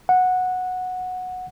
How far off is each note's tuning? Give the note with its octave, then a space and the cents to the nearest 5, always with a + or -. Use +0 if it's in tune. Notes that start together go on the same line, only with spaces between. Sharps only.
F#5 -10